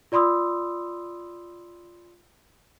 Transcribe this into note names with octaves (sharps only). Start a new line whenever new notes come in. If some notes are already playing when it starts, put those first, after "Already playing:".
F4 D5 B5 C6 D#6 E6